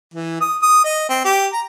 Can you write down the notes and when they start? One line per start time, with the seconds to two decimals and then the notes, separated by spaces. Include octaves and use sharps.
0.14 E3
0.41 D#6
0.62 D#6
0.84 D#5
1.09 C4
1.25 G4
1.53 A#5